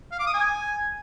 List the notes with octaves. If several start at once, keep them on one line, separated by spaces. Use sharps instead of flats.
F5
D6
D#6
G#5